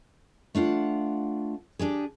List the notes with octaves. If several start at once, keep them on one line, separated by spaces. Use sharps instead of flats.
A3 D4 F4 F#5
D4 G4 G#4